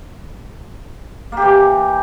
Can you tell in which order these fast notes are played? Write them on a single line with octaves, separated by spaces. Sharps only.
A#3 G4 E3